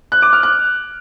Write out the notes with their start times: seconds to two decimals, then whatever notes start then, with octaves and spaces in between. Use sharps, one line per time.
0.12 F#6
0.22 D6
0.33 F6
0.43 F#6